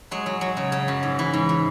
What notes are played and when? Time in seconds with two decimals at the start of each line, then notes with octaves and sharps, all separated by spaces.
0.11 F#3 G#3
0.26 F#3
0.41 F#3
0.57 C#3
0.72 C#3
0.88 F#2
1.03 G#2
1.19 E3
1.33 G#2
1.49 E3